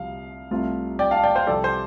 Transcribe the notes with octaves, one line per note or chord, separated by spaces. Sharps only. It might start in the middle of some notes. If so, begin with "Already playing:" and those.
Already playing: C2 C3 F3 F5
C2 C3 A3 F4
D5 G5
F5 A5
D5 G5
C5 F5
C2 C3 F3 C4 A4 D5
C5